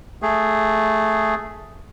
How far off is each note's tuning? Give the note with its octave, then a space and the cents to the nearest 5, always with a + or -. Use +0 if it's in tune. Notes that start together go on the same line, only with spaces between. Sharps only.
A3 +0 G#4 +0